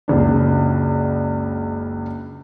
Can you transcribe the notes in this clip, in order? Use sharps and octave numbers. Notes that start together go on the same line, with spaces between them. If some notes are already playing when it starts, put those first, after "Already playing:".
F#1 C#2 D4